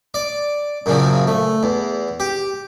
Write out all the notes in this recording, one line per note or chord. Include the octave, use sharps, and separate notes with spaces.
D5
F#2 A#2 C#3 F3
A3
E2
G4